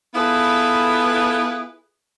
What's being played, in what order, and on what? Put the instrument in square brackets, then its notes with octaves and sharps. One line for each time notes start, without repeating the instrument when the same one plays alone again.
[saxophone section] B3 E4 F4 G#4 A4 B4